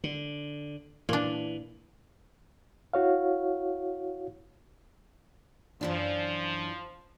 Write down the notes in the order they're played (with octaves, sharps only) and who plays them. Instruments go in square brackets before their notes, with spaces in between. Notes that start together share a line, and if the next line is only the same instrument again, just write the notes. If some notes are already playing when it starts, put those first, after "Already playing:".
[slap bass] D3
[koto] A#2 D4 [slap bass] E3
[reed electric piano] E4 F#4 C#5 F5
[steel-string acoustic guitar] F#2 E3 D4 [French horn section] F3